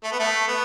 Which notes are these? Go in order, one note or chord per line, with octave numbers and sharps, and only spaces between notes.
A3
B3
A3
B3